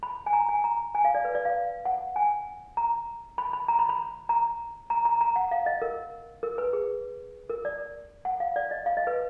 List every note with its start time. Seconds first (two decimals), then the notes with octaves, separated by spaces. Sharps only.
0.03 B5
0.26 G#5
0.33 A#5
0.48 G#5
0.64 A#5
0.95 G#5
1.05 F5
1.15 D5
1.25 B4
1.35 D5
1.45 F5
1.85 F#5
2.16 G#5
2.77 A#5
3.38 B5
3.53 B5
3.68 A#5
3.79 B5
3.89 B5
4.29 A#5
4.90 A#5
5.05 A#5
5.21 A#5
5.36 F#5
5.51 F5
5.66 D#5
5.82 A#4
6.43 A#4
6.58 B4
6.73 G#4
7.50 A#4
7.65 D5
8.25 F#5
8.40 F5
8.56 D5
8.71 D#5
8.86 F5
8.97 D#5
9.07 B4